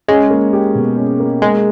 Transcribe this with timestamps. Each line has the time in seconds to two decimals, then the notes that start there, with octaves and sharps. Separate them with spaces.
0.08 G#3 C#4
0.30 A#3
0.53 G4
0.75 B2
0.97 C#4
1.20 A#3
1.42 G#3 A#3